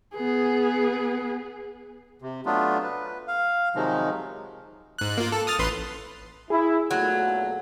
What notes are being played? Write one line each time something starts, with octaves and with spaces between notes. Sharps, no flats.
B3 G#4
C3
F#3 A3 B3 D4 F4
B4
F5
C3 D#3 F3 F#3 G#3 D#4
G#2 F#6
A#3 F4
A4
D#6 F6 A6
A1 B4 C6
E4 G#4
B1 A#2 F#3 A3